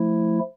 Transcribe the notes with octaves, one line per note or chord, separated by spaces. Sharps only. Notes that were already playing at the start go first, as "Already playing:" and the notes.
Already playing: F3 A3 E4